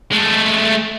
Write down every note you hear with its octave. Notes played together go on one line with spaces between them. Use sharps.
G#3 A3